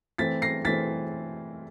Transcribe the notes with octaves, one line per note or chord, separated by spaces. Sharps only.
E3 A3 C4 A6 B6
A#6 C7
E3 A3 C4 A6 B6